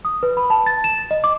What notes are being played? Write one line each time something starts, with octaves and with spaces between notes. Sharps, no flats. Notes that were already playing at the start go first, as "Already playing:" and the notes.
D#6
B4
B5
A5
A6
E7
D#5
D6